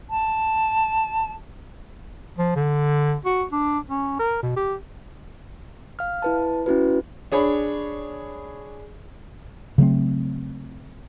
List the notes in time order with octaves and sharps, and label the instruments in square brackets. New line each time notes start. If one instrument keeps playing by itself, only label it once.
[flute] A5
[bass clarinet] F3
D3
F#4
D4
C#4
A#4
B2
G4
[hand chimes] F5 F6
E4 B4 A5
C#4 E4 F#4 B4
[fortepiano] D4 G#4 C#5 B5
[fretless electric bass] C#3 F#3 A3 C4